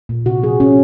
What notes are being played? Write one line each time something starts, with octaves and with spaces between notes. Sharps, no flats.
A#2
C3 F#4
F3 G#4
C3 C#4